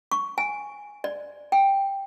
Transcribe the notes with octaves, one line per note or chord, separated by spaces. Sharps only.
C#6
G#5
D5
G5